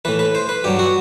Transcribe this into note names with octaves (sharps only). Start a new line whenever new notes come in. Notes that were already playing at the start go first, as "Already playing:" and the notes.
A2 E3 B4
B4
C5
B4
G2 F#3 G4
F#4